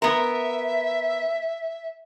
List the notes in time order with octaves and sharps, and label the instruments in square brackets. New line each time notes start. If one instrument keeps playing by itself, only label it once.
[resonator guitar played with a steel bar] B3 A#4 [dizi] E5